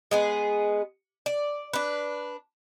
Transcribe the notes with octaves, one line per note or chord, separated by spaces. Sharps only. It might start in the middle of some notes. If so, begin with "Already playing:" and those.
G#3 B3 G#4
D5
D4 B4